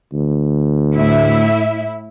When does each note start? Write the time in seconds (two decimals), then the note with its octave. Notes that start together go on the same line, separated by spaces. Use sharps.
0.13 D2
0.95 A2 E4 E5